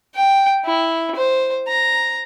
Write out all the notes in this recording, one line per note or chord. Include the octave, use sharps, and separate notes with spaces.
G5
E4
C5
A#5